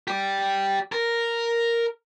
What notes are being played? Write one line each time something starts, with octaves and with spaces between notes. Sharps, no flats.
G4 D5
A#4